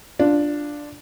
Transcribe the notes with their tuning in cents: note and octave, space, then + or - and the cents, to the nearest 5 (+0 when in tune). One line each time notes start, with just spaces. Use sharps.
D4 +0 F4 +0